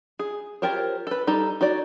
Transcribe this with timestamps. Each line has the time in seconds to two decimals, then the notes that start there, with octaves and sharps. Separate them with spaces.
0.19 G#4
0.62 F4 G4 A#4 C5 C#5
1.07 A4 B4
1.27 G3 D#4 A4 A#5
1.61 D#4 F#4 C#5 D5